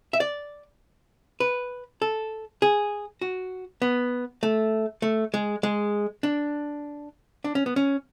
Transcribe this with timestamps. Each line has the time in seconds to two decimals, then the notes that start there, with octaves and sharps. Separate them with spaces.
0.13 E5
0.20 D5
1.40 B4
2.02 A4
2.62 G#4
3.21 F#4
3.82 B3
4.43 A3
5.02 A3
5.34 G#3
5.63 G#3
6.23 D4
7.44 D4
7.55 C#4
7.66 B3
7.76 C#4